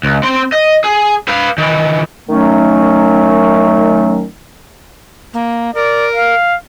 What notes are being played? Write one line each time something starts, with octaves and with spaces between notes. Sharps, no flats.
C#2
C4 C6
D#5
G#4
B4 F5
D#3 E3
D#3 F#3 A3 C#4
A#3
A#4 D5
F5